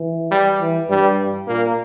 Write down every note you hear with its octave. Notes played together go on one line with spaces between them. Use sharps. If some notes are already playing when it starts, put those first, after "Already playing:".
Already playing: E3
G3
E3
G2 G3
A#2 A#3